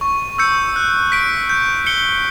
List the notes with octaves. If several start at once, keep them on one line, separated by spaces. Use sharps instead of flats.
C#6
E6 G6 C#7
F#6
B6 D7
G6
C#7 G7